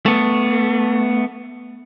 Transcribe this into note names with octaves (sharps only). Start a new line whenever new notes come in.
A3 B3